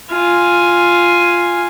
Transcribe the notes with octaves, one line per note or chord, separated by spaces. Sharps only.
F4 G#5